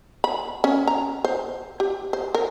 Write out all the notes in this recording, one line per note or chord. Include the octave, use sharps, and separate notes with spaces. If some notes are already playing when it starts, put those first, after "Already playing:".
B5
C#4
A#5
C5
G4
C5
A#4